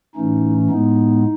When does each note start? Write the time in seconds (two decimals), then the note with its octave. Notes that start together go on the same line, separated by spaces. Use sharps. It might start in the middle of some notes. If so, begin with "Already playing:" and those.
0.15 A2 E3 A3 C#4 D#4
0.70 A2 G#3 B3 D#4